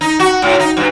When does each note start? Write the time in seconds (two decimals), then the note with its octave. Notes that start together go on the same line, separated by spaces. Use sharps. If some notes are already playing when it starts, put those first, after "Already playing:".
0.01 D#4
0.19 F#4
0.42 A2
0.60 D#4
0.77 G2